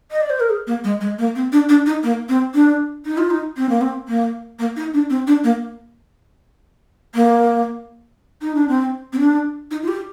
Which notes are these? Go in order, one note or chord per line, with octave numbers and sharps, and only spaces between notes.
D#5
D5
C5
A#4
G#4
A#3
G#3
G#3
A#3
C4
D4
D4
D#4
A#3
C4
D4
D#4
F4
D#4
C4
A#3
C4
A#3
A#3
D#4
D4
C4
D4
A#3
A#3
D#4
D4
C4
C4
D4
D#4
F4
G4